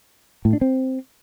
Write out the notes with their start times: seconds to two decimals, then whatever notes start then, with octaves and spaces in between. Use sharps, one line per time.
0.45 A2
0.53 D4
0.61 C4